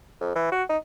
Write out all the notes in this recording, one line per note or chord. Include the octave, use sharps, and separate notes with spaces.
F2
E3
F#4
D#4